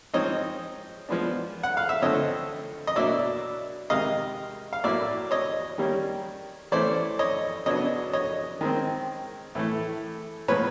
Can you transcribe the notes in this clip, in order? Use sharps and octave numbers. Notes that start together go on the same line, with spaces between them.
F3 G#3 C4 D#4 C#5 D#5
F3 G#3 B3 D4
F#5
F5
E5
D3 F3 A3 C4 C#5 D#5
D#5
B2 F#3 A#3 D4 D5 E5
C3 D#3 G#3 D#5 F5
F5
A2 F#3 A#3 D5 E5
C#5 D#5
D#3 G3 A#3 C#4
E3 A3 C#4 C5 D5
C#5 D#5
C#3 F#3 B3 D4 C#5 D#5
C#5 D#5
D#3 G#3 C4
A2 E3 A3
A#2 F3 G#3 B3 B4 C#5